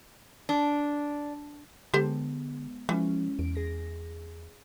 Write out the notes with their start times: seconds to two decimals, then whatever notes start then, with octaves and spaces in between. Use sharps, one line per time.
0.49 D4
1.94 D3 G#3 B3 G4 A4 C5
2.89 E3 F3 G#3 C#4
3.39 E2 D7
3.55 G#4 A#6